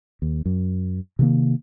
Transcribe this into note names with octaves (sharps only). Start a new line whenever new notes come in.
D#2
F#2
C3 D#3 A#3